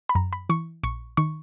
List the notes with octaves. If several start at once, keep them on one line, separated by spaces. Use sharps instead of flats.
B5
F#2 A#5
B5
E3 C#6
A#1 C#6
D#3 C#6